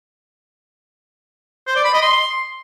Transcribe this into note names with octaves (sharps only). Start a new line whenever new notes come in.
C5
D5
B5
D#5
C6